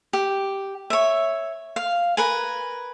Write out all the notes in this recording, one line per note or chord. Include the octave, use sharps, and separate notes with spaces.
G4
C#5 E5
F5
A#4 B4 G#5